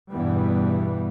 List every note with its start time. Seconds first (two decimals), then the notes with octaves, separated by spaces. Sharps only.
0.11 E2 G2 B2 E3 G3 B3